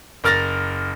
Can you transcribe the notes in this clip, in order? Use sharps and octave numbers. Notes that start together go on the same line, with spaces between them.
F#1 A#4 F6 A6 A#6 F7